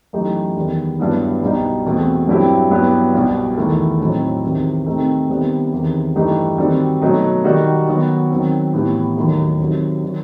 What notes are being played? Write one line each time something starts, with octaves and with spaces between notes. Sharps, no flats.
F#2 E3 A3 D#4 G4
E2 D#3 G3 B3
G2 F#3 B3 E4
C2 B2 G3 D#4 G4
E2 B2 A3 C4
G2 F#3 C4 E4 G4
G2 F#3 B3 E4 G4
C2 B2 G3
E2 D#3 A3 E4
A2 F#3 C4 D#4
E2 C3 D#3
C3 D#3 A3 C4 D#4
C3 D#3 G3 B3
E2 C3 D#3
G2 E3 A3 D#4 G4
D#3 G3 C4 F#4
B2 F#3 A3 D#4
D#3 G3 D#4 F#4
D#3 F#3 B3 F#4
D#3 F#3 C4
A2 E3 B3 E4 G4
D#2 D#3 F#3 A3 D#4
C3 D#3 F#3
D#3 F#3